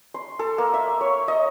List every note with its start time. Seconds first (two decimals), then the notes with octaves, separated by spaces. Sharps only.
0.14 C6
0.39 A4
0.58 A#3
0.74 E5
1.01 C#5
1.28 D#5